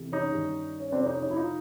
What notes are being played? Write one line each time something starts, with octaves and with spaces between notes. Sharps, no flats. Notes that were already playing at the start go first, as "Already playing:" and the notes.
Already playing: F2 C3 E3
C#4 D#4
G2 D#3 G3
C#4
F2 C3 F3 C4 D4
C#4 D#4
C#4 D#4
E4
D#4 F4